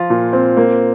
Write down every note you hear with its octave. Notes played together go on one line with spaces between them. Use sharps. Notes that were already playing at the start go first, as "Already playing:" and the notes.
Already playing: F3 F4
A#2
C4
A#3